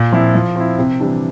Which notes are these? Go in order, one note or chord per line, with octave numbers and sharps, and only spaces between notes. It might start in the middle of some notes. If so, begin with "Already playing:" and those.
Already playing: A#2
F3 C4 E4
F3
C4 E4
C3
E3 G3 D4